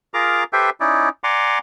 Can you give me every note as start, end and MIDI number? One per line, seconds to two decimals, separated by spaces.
0.14 0.44 65
0.14 0.44 68
0.14 0.44 70
0.14 0.44 82
0.14 0.44 86
0.53 0.70 67
0.53 0.70 69
0.53 0.70 71
0.53 0.70 72
0.53 0.70 76
0.53 0.70 79
0.80 1.09 61
0.80 1.09 63
0.80 1.09 64
0.80 1.09 74
1.24 1.59 74
1.24 1.59 78
1.24 1.59 80
1.24 1.59 82
1.24 1.59 84
1.24 1.59 86